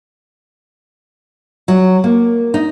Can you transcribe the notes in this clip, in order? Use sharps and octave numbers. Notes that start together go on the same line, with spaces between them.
F#3
A#3
D#4